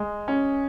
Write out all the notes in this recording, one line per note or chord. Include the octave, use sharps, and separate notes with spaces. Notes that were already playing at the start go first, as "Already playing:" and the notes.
Already playing: G#3
C#4